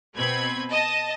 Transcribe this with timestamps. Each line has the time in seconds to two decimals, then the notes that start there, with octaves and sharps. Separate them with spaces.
0.15 B2 C4 B4 B5 G#6
0.70 D#5 A5